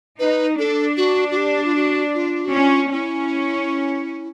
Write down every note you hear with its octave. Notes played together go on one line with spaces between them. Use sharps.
D#4 B4
D4 A4
F#4
F#4
G4
F4
F#4
F4
F#4
C#4 F4
C#4 E4